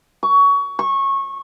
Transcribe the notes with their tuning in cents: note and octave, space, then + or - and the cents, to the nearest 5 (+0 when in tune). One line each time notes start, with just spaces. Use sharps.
C#6 +25
C#6 -20